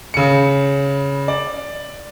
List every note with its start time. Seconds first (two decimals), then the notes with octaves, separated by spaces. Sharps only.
0.14 C#3 C#7
1.28 D5